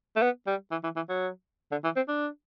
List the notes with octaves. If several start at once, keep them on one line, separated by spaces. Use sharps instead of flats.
A3
B3
G3
E3
E3
E3
F#3
D3
E3
C4
D4